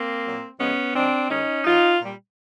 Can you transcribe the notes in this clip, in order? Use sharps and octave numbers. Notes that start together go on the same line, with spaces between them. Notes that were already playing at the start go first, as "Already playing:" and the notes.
Already playing: A#3 C4
A#2 F#3
A2 F3 G#3 B3 C#4
G#2 F3 G#3 C4 D4
G2 D#3 G#3 C#4 D#4
B2 F#3 D#4 F4
A#2 G3